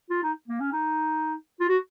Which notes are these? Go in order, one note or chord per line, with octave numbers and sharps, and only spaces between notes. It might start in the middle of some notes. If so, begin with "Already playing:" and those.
F4
D#4
A#3
C#4
D#4
F4
F#4